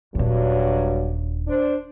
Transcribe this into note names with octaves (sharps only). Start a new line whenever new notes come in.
D#1 G2 F#3 D4
D4 C5